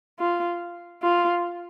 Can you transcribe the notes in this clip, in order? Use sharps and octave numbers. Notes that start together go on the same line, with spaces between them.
F4
F4